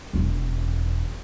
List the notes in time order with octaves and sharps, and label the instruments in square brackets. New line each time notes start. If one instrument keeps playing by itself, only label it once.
[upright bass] E1 E2